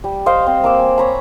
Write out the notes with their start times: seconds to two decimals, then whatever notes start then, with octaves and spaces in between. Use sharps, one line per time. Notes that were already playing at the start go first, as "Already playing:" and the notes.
0.04 G3
0.26 C5 D#5 F5 G5
0.47 C4
0.64 A#3 D6 E6
0.79 G#5
0.98 C#5 A#5 B5